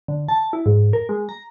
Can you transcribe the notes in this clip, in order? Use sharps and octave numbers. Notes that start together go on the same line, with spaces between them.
D3
A5
E4
G#2
A#4
G#3
A#5